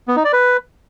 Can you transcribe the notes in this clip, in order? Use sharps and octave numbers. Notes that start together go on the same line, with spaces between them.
B3
D#4
D5
B4